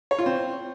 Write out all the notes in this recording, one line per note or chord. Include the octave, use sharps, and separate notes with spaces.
C#5
F4
C4